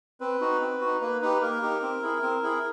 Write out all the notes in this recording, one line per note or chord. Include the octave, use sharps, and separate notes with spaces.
C4 B4
D#4 F#4
C4
D#4 F#4
A#3 B4
D#4 G4 B4
A#3 A#4
D#4 G4
C4
E4 G#4
C4
E4 G#4